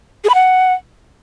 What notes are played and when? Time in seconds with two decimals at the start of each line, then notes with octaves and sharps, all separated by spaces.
0.24 G#4
0.29 B5
0.34 F#5